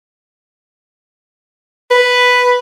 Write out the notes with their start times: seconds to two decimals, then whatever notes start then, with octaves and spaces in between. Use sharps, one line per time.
1.91 B4